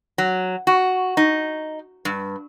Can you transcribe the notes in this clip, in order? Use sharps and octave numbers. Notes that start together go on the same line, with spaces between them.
F#3
F#4
D#4
G2